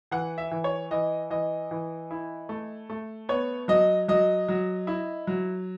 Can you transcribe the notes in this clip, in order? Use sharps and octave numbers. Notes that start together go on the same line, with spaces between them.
E3 F#5
E5
E3
C#5
E3 D#5
E3 D#5
E3
E4
A3
A3
B3 C#5
F#3 D#5
F#3 D#5
F#3
E4
F#3